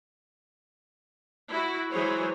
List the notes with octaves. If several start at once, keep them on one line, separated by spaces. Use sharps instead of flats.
E4 F#4
E3 F#3 G#3 G#4 C5 C#5